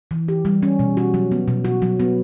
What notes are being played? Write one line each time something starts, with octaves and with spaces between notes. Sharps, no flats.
E3
G4
G3
C#4
B2
F#4
F#3
B3
B2
F#4
F#3
B3